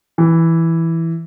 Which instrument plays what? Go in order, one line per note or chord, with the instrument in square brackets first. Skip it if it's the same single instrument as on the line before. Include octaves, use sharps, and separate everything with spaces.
[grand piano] E3